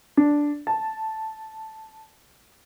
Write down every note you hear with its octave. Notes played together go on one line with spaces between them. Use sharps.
D4
A5